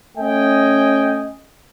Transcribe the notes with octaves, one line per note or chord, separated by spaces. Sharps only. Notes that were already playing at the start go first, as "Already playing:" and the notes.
A3 C#4 D#5 G5 G#5